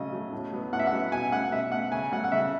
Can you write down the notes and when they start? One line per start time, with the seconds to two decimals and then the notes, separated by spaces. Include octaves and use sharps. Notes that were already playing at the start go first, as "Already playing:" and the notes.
Already playing: C#3 F#3 A3 D#5
0.12 F#3 A3
0.32 A2
0.52 F#3 B3
0.72 A2 F#5
0.79 E5
0.87 F#5
0.93 F#3 B3
1.12 B2 G#5
1.32 A3 F#5
1.52 B2 E5
1.72 A3 F#5
1.92 C#3 G#5
2.12 F#3 A3 F#5
2.24 F#5
2.32 C#3 E5